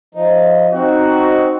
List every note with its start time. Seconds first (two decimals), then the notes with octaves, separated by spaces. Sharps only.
0.15 F3 D#4
0.73 C4 D#4 F#4